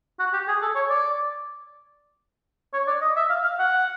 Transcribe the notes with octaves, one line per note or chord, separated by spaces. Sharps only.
F#4
G4
G#4
A4
C#5
D5
C#5
D5
D#5
E5
F5
F5
F#5